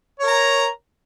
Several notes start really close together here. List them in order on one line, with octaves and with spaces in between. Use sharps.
C#5 A#4 A#5